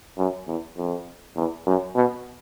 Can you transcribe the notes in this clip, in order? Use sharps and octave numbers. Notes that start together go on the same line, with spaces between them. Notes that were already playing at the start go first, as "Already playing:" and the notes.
F#2
E2
F2
E2
F#2
B2